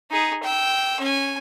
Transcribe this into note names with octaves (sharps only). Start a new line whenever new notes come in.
D#4 G#4
G5 E6
C#4 G#5